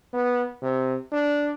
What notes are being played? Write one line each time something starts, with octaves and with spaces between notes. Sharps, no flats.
B3
C3
D4